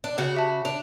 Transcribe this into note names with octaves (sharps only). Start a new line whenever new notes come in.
D4
C#3 F#4
G4 E5 A5
D4 F7